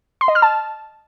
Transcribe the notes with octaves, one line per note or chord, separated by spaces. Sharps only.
C6
D#5
F6
A5